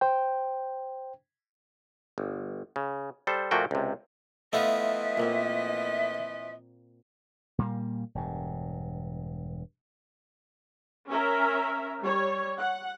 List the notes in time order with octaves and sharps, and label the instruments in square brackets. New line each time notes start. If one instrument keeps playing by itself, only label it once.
[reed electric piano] C5 G5
[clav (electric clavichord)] G1
C#3
G3 A4 C5
A#2 F3 A3 A#3 F#4 G5
C#2 C3
[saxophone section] E3 F3 D#5 [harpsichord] A3 B3 F4 [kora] A4 [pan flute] E5
[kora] A#2 A#3 C4
[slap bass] A#2 G3 A#3
E1 G2
[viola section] C#4 A#4 E5
G3 C#5
F#5